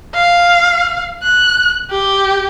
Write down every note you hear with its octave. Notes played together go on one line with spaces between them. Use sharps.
F5
F#6
G4